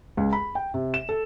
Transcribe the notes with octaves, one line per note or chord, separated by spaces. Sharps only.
C#2
B5
G5
C3
E7
A4